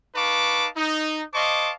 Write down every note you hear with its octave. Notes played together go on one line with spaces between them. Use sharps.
D#4 B4 F5 A5 C#6 D6
D#4
C5 D#5 F5 A5 C#6 D6